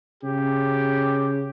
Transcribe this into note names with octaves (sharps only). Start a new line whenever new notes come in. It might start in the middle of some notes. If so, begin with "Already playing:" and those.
C#3 G4